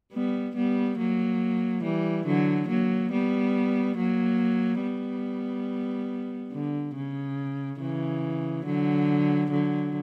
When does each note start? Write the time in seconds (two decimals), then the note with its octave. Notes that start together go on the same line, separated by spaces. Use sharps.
0.13 G3 B3
0.56 G3 B3
0.99 F#3 A#3
1.83 E3 G3
2.26 D3 F#3
2.69 F#3 A#3
3.12 G3 B3
3.97 F#3 A#3
4.82 G3 B3
6.53 D3
6.95 C#3
7.80 C#3 E3
8.65 D3 F#3
9.51 D3 F#3